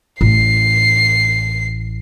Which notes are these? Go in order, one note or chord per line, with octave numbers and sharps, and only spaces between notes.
A1 C7